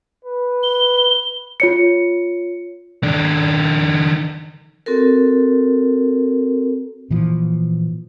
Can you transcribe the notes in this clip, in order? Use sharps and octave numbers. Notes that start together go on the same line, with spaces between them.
B4
G7
F4 C#5 C#7
D#3 D4
C4 F#4 A4 A#4
A#2 E3 F3